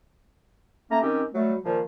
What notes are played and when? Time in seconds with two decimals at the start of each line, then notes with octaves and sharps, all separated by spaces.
0.90 A3 A#3 C#4 A#5
1.01 D#3 C4 C#4 G4
1.32 F#3 G3 A3
1.64 A#2 D#3 F3 G3